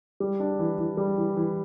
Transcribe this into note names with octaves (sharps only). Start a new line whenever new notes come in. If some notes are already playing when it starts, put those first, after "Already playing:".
G3
D4
E3
E3
G3
E3
E3